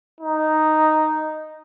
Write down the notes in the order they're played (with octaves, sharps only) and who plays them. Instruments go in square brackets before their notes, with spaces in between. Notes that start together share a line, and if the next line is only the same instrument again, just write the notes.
[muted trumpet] D#4